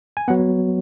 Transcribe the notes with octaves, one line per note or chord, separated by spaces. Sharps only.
G#5
F#3 B3 F#5